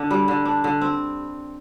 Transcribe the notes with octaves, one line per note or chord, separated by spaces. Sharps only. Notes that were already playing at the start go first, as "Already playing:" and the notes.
Already playing: D3 D4
G3
D3
D4
D3
C4